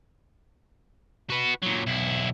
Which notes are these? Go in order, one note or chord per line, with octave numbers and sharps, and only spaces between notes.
F#4 B4
A#2 F#3
B1 E4